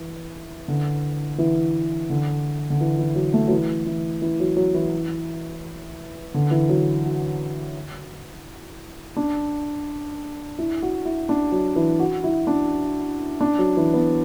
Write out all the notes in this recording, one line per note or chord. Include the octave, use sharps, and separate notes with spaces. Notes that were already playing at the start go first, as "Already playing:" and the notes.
Already playing: E3
D3
E3
D3
D3
E3
E3
F#3
A3
F#3
E3
E3
E3
F#3
F#3
E3
D3
E3
F#3
F#4
D4
E4
F#4
E4
D4
F#3
E3
F#4
E4
D4
D4
F#3
E3
B3